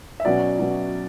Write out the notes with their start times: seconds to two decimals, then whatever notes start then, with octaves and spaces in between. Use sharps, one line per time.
0.20 E5
0.25 B2 F#3 C#4 D5
0.59 B2 F#3